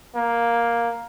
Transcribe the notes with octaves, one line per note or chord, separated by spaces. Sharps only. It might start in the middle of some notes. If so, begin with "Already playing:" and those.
A#3